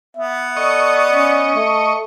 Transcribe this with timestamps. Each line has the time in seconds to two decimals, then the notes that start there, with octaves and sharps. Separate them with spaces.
0.16 B3 E5
0.57 A4 D5 D#5 C#6
1.10 C#4
1.56 A3 A4